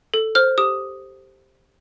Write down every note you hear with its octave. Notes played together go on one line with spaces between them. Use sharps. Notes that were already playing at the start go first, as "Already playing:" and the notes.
A4
C5 F6
G4 D#6